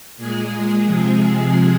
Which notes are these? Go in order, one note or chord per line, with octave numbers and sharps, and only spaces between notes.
A#2 G#3 G#4
C3 F3 G#3